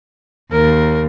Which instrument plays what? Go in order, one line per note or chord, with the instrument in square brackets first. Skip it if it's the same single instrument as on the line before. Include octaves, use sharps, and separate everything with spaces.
[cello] D#2 [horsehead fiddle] A#4